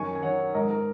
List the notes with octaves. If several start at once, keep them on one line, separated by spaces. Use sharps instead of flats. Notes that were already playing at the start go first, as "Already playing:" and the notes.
Already playing: F#2 D#3 G#5 C#6
G#5
D#3 C#5 F#5
G#2 A#4 D#5
A#4